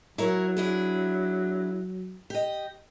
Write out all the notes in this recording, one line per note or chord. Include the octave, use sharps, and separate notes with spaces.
F#3 E4 A#4 C#5
D4 E4 G#4
G4 D#5